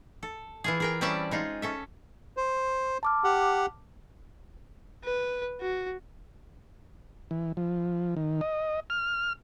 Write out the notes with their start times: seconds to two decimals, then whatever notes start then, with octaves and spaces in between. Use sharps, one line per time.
0.23 A4
0.64 E3 F4 G#4
0.80 G#4 A#4 G5
1.01 G3 C4 C#4 D5 E5 A5
1.31 G#3 D#4 F4
1.62 C#4 A4 E5
2.37 C5
3.03 A5 D6 F6
3.24 G4 F#5
5.04 B4
5.61 F#4
7.31 E3
7.57 F3
8.17 D#3
8.41 D#5
8.90 F6